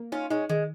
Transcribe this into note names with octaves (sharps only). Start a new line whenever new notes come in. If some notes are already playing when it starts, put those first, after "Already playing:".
Already playing: A#3
C#4 D#4 F4
G#3 C#4 D#4
D#3 G#3